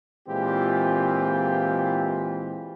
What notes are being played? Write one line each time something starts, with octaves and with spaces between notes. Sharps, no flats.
A#2 E3 G#3 C4 F4 G4